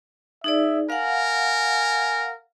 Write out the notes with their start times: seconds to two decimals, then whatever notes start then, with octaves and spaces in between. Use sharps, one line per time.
0.44 D#4 G#4 D5 E5
0.90 A#4 F5 F#5 G#5